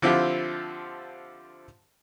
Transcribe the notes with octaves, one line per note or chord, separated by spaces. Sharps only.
D3 F3 C4 E4 F4 G4